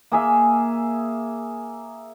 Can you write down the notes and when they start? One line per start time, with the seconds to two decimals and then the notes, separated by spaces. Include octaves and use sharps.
0.12 A#3 G#4 E5